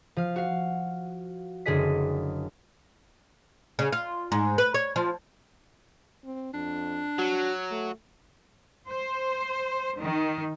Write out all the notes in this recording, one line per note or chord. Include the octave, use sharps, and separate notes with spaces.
F3 F5
F#4 F5
F#1 D3 G#4 D#5 B6
C#3
F4
G#2
B4
C#5
F3
C4
F2 D4
F#3 F#4
A3
C5
D#3